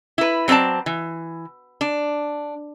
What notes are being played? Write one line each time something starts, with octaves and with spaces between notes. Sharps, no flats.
E4 B4
F#3 C4 F4 D5 A5
E3
D4